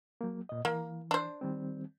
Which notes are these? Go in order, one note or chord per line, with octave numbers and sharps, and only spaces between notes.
F#3 A#3
A#2 D#5
E3 A#3
D4 C5
D#3 G3 C4